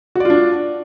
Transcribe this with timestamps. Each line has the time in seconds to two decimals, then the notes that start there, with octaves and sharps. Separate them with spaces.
0.15 F#4
0.20 D5
0.25 F4
0.30 D4